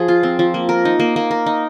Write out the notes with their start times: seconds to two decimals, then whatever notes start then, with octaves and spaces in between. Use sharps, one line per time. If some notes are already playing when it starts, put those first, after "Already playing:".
Already playing: F3 G#4
0.08 F4
0.23 C4
0.39 F3
0.54 A#3
0.69 A#4
0.85 D#4
1.00 A#3
1.16 A#3
1.31 A#4
1.46 D#4